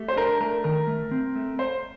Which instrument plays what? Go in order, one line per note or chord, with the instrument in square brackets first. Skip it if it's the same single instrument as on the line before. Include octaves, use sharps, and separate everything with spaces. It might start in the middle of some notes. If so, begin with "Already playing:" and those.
Already playing: [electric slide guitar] A3 G4
[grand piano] C5
[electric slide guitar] D4 [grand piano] A#4
[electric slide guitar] A3 [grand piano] A#4
[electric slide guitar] D#3 [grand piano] A#4
[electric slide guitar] A3
C4
A3
[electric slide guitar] A3 [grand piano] C5